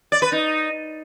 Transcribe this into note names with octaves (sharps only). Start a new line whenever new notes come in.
D5
B4
D#4